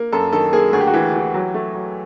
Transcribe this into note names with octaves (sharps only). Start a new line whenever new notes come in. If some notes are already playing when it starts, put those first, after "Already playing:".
Already playing: A#3
F#2 A4
D#3 A4
A#3 G#4
D2 G#4
G4
F#4
E3 G4
E3
F#3
A3
F#3